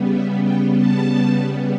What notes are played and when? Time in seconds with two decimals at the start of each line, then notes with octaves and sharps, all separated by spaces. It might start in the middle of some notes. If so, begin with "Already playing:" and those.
Already playing: C#3 G3 B3
0.11 E5
0.42 G5
0.74 A5